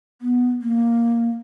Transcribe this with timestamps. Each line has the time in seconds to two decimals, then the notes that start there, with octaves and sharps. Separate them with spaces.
0.22 B3
0.61 A#3